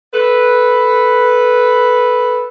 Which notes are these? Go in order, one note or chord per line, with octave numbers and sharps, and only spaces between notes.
A4 B4